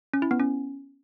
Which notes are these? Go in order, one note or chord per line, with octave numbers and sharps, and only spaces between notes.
C#4
E4
B3
C#4